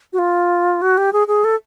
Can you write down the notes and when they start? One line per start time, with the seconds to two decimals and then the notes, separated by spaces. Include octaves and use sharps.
0.13 F#4
0.18 F4
0.82 F#4
0.98 G4
1.13 G#4
1.28 G#4
1.44 A4